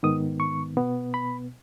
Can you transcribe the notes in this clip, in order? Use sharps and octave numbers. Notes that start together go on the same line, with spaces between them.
G#2 D#3 B3 D#6
C#6
B2 B3
B5